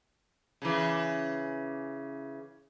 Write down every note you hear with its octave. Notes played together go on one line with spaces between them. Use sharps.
C#3 E3